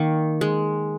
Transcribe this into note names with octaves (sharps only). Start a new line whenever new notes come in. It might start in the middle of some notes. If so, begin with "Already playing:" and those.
Already playing: D#3 A#3
G#3